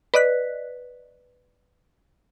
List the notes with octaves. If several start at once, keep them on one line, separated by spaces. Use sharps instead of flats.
B4 D5 D#5 F#6 B6